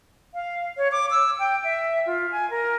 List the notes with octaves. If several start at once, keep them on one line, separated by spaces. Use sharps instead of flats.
F5
C#5
D6
E6
G5
E5
F4
G#5
A#4